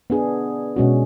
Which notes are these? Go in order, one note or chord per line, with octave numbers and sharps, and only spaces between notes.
B3 D4 G#4
B2 G#3 C#4 F#4